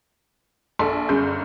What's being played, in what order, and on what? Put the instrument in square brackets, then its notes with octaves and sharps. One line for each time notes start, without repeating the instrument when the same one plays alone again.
[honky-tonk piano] A#1 A4
G1 F#2 G#4 G6